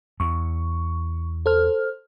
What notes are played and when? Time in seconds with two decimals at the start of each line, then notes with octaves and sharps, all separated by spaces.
0.20 E2 C#6
1.46 A4 C5 F6